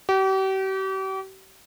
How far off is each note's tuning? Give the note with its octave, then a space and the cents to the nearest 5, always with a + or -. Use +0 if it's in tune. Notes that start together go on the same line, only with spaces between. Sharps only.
G4 -40